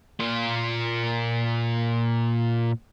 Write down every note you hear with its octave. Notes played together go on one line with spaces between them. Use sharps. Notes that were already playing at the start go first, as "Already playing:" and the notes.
A#2 F4